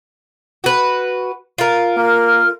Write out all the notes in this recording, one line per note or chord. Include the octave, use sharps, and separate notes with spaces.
F#4 B4
F4 A#4
A#3 F6